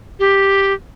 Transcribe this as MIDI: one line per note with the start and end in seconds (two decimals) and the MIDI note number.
0.19 0.73 67